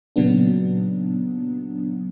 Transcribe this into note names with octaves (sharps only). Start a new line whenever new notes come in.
A#2 C#3 F#3 B3 D4